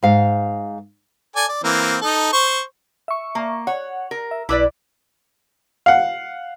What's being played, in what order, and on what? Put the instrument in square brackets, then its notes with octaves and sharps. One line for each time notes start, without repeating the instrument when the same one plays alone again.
[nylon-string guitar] G#2 F5
[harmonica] A4 D5 G#5
D5
E3 A#3 C4
D#4 A4
C5 C#6
[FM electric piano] E5 C#6
[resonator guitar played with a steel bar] A#3
[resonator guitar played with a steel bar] C#5 [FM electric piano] F#5
[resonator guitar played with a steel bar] A#4
[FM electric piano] E5
[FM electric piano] B1 D6 [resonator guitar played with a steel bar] E4 B4 D5
[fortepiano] F5 F#5